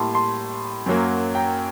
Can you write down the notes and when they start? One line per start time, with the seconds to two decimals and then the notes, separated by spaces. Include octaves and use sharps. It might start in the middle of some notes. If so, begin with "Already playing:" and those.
Already playing: A2 G3 A#3 A5 C6
0.14 A5 C6
0.86 F#2 F#3 A#3
1.35 G5 A#5